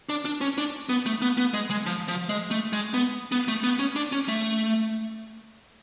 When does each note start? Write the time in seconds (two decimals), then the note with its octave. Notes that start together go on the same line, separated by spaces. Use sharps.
0.09 D4
0.25 D4
0.41 C#4
0.58 D4
0.89 B3
1.06 A3
1.22 B3
1.37 B3
1.54 G#3
1.70 G#3
1.86 F3
2.08 F3
2.29 G#3
2.51 A3
2.73 G#3
2.94 B3
3.32 B3
3.48 A3
3.64 B3
3.79 C#4
3.96 D4
4.12 C#4
4.28 A3